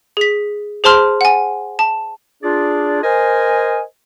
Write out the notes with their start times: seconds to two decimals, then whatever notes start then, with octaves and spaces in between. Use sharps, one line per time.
0.17 G#4 B6
0.84 G#4 C5 A5 C6 F6
1.21 F#5 G#5
1.79 A5
2.43 D4 F4 G#4 D5
3.03 A#4 C5 D#5 G#5